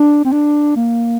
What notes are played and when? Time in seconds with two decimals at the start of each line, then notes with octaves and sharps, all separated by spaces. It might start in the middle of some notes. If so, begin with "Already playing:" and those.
Already playing: D4
0.25 C4
0.32 D4
0.76 A#3